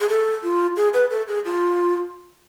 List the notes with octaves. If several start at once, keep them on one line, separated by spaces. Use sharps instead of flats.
G#4
A4
F4
G#4
B4
A4
G#4
F4